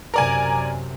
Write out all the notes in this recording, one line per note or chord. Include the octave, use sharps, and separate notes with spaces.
F#2 C3 A#4 D5 G#5